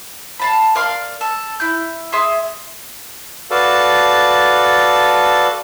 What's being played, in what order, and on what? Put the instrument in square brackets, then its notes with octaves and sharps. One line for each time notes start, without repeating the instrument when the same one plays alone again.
[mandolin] F5 A5 B5
A#4 D5 F5 C6
A4
E4 G6
G#4 E5 C6
[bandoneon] F#4 A4 B4 D5 F5 A5